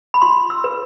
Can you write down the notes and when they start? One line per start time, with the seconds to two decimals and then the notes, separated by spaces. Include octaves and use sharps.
0.14 B5
0.22 F4 C6
0.50 E6
0.64 B4